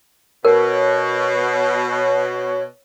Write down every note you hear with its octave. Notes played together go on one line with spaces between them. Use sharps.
B2 A#4 C#5